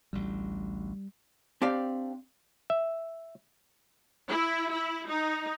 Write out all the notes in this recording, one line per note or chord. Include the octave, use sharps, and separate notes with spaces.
A1 D2 G3
C4 D4 G4 D5 F5
E5
E4
E4
D#4